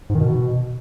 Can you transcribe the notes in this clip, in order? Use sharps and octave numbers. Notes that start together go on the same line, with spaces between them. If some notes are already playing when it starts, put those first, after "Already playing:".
G#2
D#3
B2